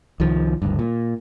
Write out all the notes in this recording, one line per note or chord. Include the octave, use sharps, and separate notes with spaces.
C2 D#3 F3
F#1 D2 G2
A#2